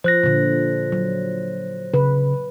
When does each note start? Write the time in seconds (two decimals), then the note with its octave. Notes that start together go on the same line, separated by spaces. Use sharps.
0.04 F3 C5 F#6 A#6
0.23 A#2 D3
0.92 F#3
1.94 C#3 B4